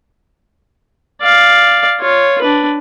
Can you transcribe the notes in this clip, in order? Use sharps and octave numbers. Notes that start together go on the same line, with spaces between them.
D5 F5
F4 C#5
D4 B4